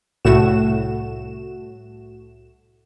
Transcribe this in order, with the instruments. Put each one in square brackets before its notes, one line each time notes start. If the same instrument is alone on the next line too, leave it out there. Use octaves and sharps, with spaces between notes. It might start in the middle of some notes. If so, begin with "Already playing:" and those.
[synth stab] C2 A2 A3 F#4 E7